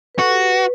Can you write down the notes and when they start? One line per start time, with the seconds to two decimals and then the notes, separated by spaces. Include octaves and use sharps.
0.15 B4
0.19 F#4 A4
0.30 G4
0.41 B4
0.51 B4